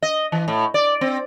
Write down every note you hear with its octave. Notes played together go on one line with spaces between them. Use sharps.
D#5
E3
A2
D5
C4